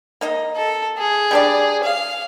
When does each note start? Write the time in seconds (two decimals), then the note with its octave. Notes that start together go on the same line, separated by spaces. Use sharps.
0.21 A#3 D#4 D#5
0.56 A4
0.99 G#4
1.31 G3 D4 D5
1.83 F5